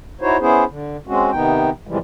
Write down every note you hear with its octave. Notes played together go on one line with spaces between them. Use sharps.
D#4 E4 F#4 C5 C#5
B3 C#4 E4 G#4 C5
D3
G#3 C4 C#4 F#4
C3 D#3 B3 D#4 G5
A2 C3 E3 F3 G3 G#3